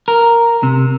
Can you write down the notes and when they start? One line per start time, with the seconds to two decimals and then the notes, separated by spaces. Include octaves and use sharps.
0.08 A#4
0.63 C3